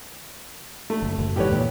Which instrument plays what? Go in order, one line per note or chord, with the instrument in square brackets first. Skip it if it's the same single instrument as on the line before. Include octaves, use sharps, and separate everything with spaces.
[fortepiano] A3
[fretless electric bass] F#1
F#1
[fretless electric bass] G#2 C3 E3 [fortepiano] G4 B4 C#5
[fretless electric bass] D#2 A#2